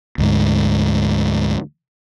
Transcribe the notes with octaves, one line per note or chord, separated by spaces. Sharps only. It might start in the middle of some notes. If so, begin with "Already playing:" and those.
D2 G#2